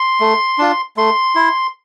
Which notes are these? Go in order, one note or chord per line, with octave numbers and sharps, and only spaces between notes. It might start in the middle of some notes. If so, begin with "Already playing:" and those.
Already playing: C6
A3
D4 F4
A3 C6
E4